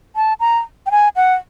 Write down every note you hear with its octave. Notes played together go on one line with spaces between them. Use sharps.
A5
A#5
G5
G#5
F#5